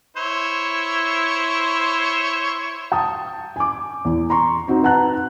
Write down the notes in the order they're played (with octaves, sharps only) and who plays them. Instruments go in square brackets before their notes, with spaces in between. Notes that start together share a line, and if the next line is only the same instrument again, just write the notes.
[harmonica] E4 C5 C#5
[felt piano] G5 A5 D#6
G#5 D6
E2
A#5 C6 C#6
C4 D#4 F#4
B4 F#5 A5 A#5 F#6